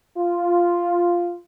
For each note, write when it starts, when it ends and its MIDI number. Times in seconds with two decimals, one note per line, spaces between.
0.17 1.35 65